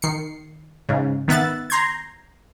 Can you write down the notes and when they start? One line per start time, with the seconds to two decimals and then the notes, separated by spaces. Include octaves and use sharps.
0.02 D#3 C7 C#7
0.89 G#2 C#3
1.28 D#3 B3 E5 F#6 A6
1.70 A#5 C6 G6 G#6